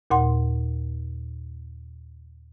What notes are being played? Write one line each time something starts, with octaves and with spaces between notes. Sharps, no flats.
D#2 A#2 F#5 C6